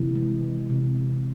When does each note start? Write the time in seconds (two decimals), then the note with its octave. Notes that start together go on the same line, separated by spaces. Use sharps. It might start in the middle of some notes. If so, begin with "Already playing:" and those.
Already playing: C3 E3
0.15 G#3
0.43 E3
0.70 C3
0.96 C3